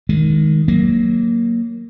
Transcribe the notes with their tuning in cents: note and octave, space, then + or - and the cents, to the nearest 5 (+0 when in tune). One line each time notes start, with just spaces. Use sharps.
D#3 +0 G#3 +0
F#3 +0 A#3 +0